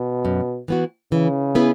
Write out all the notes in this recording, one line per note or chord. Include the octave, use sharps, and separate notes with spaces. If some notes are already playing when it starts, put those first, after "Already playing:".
Already playing: B2
F#2
E3 B3 F#4
C#3 E3
B3 E4 G#4 B4